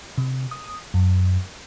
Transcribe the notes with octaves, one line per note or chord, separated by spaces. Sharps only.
C3
D#6
F#2